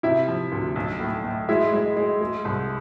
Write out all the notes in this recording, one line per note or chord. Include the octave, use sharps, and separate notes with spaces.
C3 E4 E5
F3
D2
B1
A2
A2
G#3 E4 E5
G#3
G#3
G#3
C2